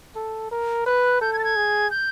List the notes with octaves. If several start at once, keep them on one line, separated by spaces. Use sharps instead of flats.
A4
A#4
B4 F#6
A4 G6
G#6
A6
G#6
G#4
G6